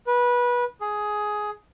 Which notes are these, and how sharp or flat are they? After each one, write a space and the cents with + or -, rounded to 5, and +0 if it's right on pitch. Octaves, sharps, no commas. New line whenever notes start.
B4 -20
G#4 +10